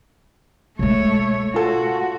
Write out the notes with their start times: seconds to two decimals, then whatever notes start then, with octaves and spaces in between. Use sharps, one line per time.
0.79 B2 G#3 A3 C#5
1.54 F4 F#4 A4